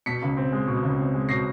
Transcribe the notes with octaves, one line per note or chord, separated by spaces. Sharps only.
B2 B6 C#7
C#2
C4
G#3
B2
C#2
C4
G#3
B2 A#6 C7